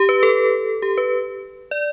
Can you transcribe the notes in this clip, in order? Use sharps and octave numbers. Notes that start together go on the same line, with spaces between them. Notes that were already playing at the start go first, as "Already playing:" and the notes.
Already playing: G4
B4
A4
G4
B4
D5